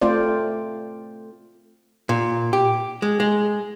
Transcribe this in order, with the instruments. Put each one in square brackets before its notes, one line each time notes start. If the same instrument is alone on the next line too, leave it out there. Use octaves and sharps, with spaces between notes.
[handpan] A3 C4 F4 C5 D5
[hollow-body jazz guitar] A#2
G4
G#3
G#3